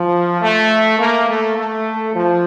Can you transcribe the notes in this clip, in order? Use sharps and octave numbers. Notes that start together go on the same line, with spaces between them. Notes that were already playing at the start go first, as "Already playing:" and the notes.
Already playing: F3
A3
A#3
A3
A3
F3